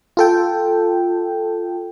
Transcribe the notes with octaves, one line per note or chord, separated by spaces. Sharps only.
F4 A4 G5